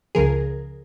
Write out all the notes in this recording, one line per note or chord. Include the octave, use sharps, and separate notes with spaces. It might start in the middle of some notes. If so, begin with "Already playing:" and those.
C#2 C#3 F3 G#4 A#4